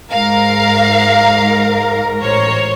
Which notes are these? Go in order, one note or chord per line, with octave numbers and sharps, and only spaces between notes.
G#2 A#4 F5 A#5
A1 C5 C#5